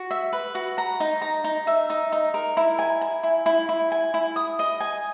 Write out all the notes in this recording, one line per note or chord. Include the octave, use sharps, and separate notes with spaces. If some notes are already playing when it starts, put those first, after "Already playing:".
Already playing: F#4
E5
B4
F#4
A#5
D#4
A#5
D#4
E5
D#4
D#4
A#4
E4
G#5
G#5
E4
E4
E4
G#5
E4
D#6
D#5
G#5